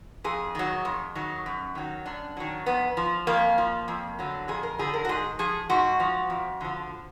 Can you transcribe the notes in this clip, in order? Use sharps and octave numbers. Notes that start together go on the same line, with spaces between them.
F2 G#4
D#3 F#3
F2
D#3 F#3
F#2
D#3 F#3
F#2 D4
D#3 F#3
F2 B3
F3
F2 A#3
F3
F2
D3 F#3
F2 G#4
A#4
D3 F#3 G#4
A#4
F#4
G#2 G#4
F3 G#4
G#2 F#4
F3
F2
D3 F3